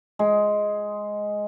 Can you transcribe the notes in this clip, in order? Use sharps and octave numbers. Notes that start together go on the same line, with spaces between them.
G#3